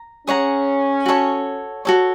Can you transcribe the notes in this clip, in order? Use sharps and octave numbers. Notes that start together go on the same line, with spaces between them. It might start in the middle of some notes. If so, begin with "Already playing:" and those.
Already playing: A#5
C#4 G#4 C#5 F#5 A#5
F#4 A4 C#5
F#4 A4 C#5